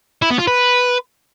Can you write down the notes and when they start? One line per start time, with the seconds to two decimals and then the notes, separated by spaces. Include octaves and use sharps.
0.22 E4
0.31 B3
0.39 F4
0.47 B4